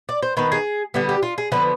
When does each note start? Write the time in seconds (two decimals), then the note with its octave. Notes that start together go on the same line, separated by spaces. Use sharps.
0.09 D5
0.22 C5
0.37 D#3 B3 B4
0.52 G#4
0.94 D3 G3 B3 G4
1.09 G4
1.23 F4
1.38 G#4
1.52 D3 F3 B3 B4